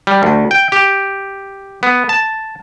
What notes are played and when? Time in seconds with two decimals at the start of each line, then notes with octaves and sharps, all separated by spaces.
0.07 G3
0.23 D2
0.51 G5
0.72 G4
1.83 B3
2.09 A5